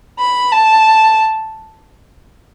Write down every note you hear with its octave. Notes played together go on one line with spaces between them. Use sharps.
B5
A5